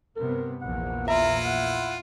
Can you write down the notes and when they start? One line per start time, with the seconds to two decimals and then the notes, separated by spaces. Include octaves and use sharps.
0.16 G2 C3 B3 A#4
0.62 A#1 E2 A#3 F#5
1.08 E4 F4 E5 A#5
1.45 F#5